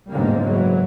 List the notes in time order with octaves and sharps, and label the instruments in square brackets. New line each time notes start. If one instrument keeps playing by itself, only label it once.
[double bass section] F#1 E2 G#2 D3 G3 A#3
E3 F#3